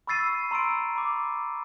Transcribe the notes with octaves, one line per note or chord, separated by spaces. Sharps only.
B5 C#6 E6 A6 C7 D#7
A#5 C6 E6 D7
B5 D6